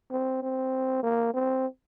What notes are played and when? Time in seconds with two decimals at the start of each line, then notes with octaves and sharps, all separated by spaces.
0.11 C4
0.42 C4
1.03 A#3
1.34 C4